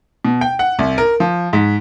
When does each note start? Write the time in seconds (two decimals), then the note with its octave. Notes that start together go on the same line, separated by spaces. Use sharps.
0.25 B2
0.41 G5
0.59 F#5
0.79 C2
0.98 A#4
1.20 F3
1.53 G#2